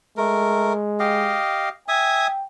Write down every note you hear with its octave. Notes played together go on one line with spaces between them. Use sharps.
G#3 A3 A#4
G4 D#5 F5
E5 G5 G#5 D#6